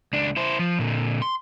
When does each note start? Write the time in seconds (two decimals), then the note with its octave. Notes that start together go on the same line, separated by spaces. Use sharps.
0.13 C#2 D4
0.37 E4 C5
0.59 F3
0.79 A#2 D3
1.22 C6